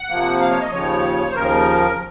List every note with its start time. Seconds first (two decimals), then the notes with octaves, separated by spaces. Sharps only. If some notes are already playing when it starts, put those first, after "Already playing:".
Already playing: F#5
0.09 C3 F3 A#3
0.41 F5
0.51 C#5
0.61 D#5
0.72 D#2 C#3 F3 C#5
1.29 C5
1.35 D#2 C#3 F3 A#4